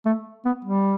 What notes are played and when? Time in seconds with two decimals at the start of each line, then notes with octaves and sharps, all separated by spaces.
0.05 A3
0.45 B3
0.65 G3